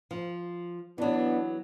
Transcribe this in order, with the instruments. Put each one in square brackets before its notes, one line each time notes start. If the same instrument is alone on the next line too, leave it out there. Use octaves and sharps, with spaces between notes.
[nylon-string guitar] F3
[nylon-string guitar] E3 F#3 [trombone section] B3 D4